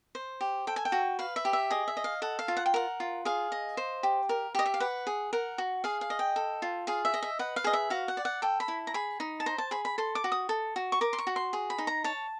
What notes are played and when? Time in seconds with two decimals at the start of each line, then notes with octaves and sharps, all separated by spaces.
0.15 C5
0.41 G4
0.67 A4 G5
0.76 G#5
0.85 G5
0.92 F#4
1.19 B4 F5
1.36 E5
1.45 G4
1.53 E5
1.70 G#4 D#5
1.88 E5
1.97 D#5
2.04 F5
2.22 A4 F#5
2.39 F5
2.48 F4
2.57 F#5
2.66 G5
2.74 A#4 F#5
3.00 F4
3.25 G#4 F5
3.52 D#5
3.77 C5
4.03 G4
4.29 A#4
4.55 G4 D#5
4.66 E5
4.74 F5
4.80 B4 F#5
5.07 G#4
5.33 A#4 F#5
5.58 F#4
5.84 G#4 F5
6.01 F5
6.10 D#5
6.19 G5
6.36 A4
6.62 F4
6.87 G#4 F5
7.05 E5
7.14 D#5
7.23 E5
7.39 B4 F#5
7.56 F5
7.64 G#4 D#5
7.73 E5
7.90 F#4 F5
8.08 F#5
8.17 D5
8.25 F#5
8.42 A4 G5
8.60 B5
8.68 E4
8.87 A#5
8.94 G#4 B5
9.20 D#4
9.40 A5
9.46 C5 A#5
9.58 A5
9.71 G#4 B5
9.85 B5
9.98 A4 C6
10.15 D6
10.24 F#4
10.32 D#6
10.49 A4
10.76 F#4
10.92 C#6
11.01 A#4 D6
11.13 C6
11.18 C#6
11.27 F#4
11.36 C6
11.53 G#4
11.70 B5
11.78 D#4
11.87 A#5
12.04 C#5 A5